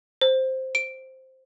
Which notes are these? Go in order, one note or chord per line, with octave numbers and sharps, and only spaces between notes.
C5
D7